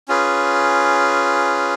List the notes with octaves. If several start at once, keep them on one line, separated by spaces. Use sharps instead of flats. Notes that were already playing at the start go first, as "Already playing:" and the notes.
C#4 F4 G#4 B4